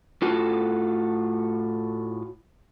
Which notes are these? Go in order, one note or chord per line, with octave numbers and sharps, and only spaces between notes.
A2 F4 F#4 A4